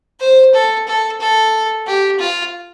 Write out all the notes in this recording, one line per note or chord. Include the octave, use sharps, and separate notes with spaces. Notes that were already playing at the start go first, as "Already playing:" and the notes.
C5
A4
A4
A4
G4
F4